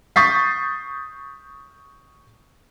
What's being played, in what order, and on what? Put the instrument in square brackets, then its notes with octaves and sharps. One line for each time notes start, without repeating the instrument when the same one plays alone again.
[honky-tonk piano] C#6 D#6 G6 A6 B6 C7